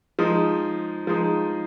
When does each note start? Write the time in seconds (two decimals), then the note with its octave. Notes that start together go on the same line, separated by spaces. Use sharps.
0.19 F3 G#3 D#4
1.07 F3 G#3 D#4